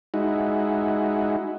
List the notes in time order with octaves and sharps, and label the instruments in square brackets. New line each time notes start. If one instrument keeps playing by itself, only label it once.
[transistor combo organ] G#3 D#4 E4 F#4